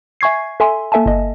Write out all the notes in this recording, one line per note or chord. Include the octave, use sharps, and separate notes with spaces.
E5 G#5 C#6 G#6 C7
A4 E5 G#5 C6
A#3 A4 E5 G#5 A5
G1 D#5